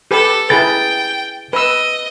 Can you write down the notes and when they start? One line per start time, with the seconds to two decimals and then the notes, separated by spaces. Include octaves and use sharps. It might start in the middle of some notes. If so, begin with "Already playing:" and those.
0.11 G4 A4 B4
0.50 E4 G#4 B4 G5 A6
1.53 B4 D#5 E6